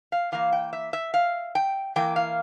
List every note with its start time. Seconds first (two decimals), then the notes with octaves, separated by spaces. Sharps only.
0.12 F5
0.32 E3 A#3 F5
0.52 G5
0.73 E5
0.93 E5
1.14 F5
1.55 G5
1.96 E3 A#3 G5
2.16 F5